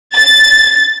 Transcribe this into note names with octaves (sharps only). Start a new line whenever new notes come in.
A6